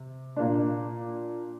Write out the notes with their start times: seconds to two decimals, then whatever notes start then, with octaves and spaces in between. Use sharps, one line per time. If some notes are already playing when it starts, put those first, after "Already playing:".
Already playing: C3
0.36 A#2 A#3 D4